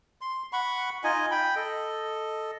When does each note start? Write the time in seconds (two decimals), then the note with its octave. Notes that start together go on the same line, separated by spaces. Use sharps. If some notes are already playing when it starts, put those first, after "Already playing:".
0.21 C6
0.53 F#5 B5 C#6
1.04 D#4 F4 D#5 G#5
1.31 G5 B5
1.56 A4 D#5